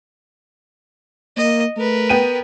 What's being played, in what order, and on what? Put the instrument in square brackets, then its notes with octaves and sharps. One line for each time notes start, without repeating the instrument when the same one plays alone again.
[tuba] A#3 [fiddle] D#5
[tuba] A3 [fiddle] A#4 B4
[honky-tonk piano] B3 G5 D#7